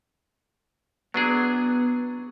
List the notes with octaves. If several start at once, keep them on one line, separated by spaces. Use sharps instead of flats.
F#3 B3 D4 G#4